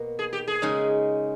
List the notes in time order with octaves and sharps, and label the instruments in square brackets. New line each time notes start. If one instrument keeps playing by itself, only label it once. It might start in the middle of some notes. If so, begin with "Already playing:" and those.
Already playing: [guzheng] B2 A#3
[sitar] G#4
G4
G#4
[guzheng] C#3 G#3 D#4